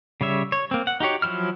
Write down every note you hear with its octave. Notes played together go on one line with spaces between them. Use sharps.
C#3 G3 C#5 E5
C#5
A#3 C4
F#5
D#4 F#4 G4 C#5
F3 F#3 E4 F6